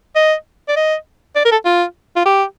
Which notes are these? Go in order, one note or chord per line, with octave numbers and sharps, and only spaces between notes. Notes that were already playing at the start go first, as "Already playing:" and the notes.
D#5
D5
D#5
D5
A#4
A4
F4
F4
G4